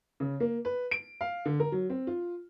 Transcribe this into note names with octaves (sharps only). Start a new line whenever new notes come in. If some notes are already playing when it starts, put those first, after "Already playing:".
C#3
A#3
B4
D7
F5
D3
A#4
F#3
C4
F4